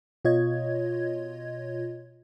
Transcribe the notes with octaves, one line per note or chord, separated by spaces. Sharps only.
B2 F4 C#5 D#5 G#6